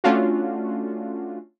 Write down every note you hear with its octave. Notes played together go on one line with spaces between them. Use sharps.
A3 C#4 D4 F4 F#4